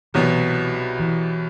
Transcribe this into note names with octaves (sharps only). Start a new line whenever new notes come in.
C2 B2 E3 F#3 B3
E3